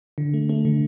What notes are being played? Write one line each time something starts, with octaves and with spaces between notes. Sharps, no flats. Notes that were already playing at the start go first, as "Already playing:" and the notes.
D3
A3
A3
D3